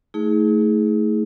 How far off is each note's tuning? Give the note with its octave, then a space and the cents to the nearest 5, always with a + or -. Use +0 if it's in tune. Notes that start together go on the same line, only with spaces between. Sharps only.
A3 +0 D#4 +45 G#4 +5